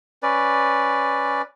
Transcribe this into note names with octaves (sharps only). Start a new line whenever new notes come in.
C#4 B4 D5